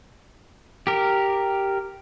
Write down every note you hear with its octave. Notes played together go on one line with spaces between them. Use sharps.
G4 A#4